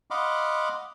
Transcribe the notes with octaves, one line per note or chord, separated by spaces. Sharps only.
D#5 F5 F#5 B5 C6 D6